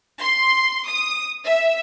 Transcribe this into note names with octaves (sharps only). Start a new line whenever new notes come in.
C6
D#6
E5